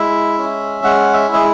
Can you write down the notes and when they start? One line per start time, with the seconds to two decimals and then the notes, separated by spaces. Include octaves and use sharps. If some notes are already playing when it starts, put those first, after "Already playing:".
Already playing: G#3 E4 E5
0.38 C#4
0.84 G#3 F#5
1.13 E5
1.28 E4
1.34 G#4